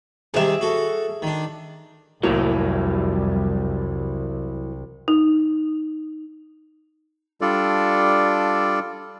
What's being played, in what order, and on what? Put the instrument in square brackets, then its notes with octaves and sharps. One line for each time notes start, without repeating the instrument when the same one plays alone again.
[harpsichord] C3 D#3 G3 [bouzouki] G#4 E5
[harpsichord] F#4 A4
D#3 D4
[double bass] C2 [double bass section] F2 G3 [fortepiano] A2 A#3 [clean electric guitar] E3 F#3
[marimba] D#4
[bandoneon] G3 D4 F4 A4 D5